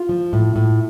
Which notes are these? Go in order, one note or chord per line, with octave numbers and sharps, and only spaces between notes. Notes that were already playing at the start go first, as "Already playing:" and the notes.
Already playing: F4
F3
A2
A2